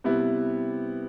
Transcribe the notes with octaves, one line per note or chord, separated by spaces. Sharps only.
C3 G3 B3 E4 B4